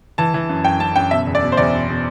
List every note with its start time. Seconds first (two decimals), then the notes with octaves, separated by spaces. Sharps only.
0.18 E3 A5
0.34 E3
0.49 F#2
0.64 F#2 G5
0.80 F#2 A5
0.96 F#2 G5
1.11 B2 E5
1.27 E2
1.35 D5
1.42 B2
1.52 C5
1.57 E2 D5
1.73 B2
1.89 B2